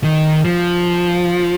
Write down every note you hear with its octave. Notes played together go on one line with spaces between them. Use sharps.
D#3
F3